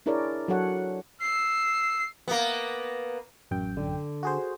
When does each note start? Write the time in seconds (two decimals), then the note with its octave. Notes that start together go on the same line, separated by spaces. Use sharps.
0.06 D4 E4 G#4 A#4 C#5 D5
0.48 F#3 D4 A4 C#5 F#5
1.22 E6 C7
2.28 A#3 B3
3.51 A1 F#2 G5
3.77 D3
4.23 F#4 G#4 C5